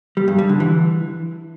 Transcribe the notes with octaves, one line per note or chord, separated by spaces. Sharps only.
G3
G2
G3
D3
E3